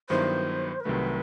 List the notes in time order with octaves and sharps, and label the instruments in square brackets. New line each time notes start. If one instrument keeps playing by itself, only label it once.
[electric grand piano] G2 D#3 F#3 B3 E4 [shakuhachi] C5
[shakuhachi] A#4
[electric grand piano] C2 C3 D#3 F#3 A3 [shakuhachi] B4